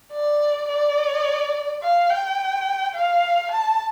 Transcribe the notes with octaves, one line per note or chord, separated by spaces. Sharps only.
D5
D5
F5
G5
F5
A5